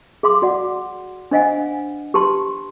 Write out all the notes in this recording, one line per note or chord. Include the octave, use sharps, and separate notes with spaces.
G#4 F5 C6 D6
F#4 D5 F#5
D4 C5 D#5 F5 F#5 G#5
G4 B4 A5 C6